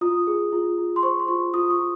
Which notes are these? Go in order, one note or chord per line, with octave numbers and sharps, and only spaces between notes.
F4 D#6
G#4
F4
F4
C6
C5 C#6
C6
F4 C#6
F4 D#6
C#6
F4